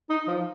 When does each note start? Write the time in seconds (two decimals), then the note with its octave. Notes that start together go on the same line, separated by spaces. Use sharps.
0.09 D#4
0.28 F3